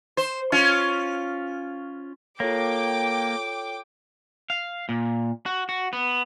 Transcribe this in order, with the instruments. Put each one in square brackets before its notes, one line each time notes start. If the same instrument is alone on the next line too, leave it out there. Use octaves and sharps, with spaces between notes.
[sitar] C5
C#4 F4
[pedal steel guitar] A#3 [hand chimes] F4 A4 C#5 [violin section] G5 D6
[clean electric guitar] F5
A#2
F#4
F#4
B3